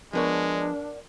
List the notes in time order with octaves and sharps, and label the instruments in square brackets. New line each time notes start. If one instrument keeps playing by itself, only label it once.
[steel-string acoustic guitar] E2 A#4 D5 [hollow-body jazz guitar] F3 B3 C#5 [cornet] G#3 [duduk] D4